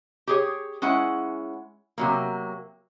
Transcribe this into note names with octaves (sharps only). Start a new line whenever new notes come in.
G4 G#4 C#5
G#3 C#4 E4 F#5
C3 F#3 A#3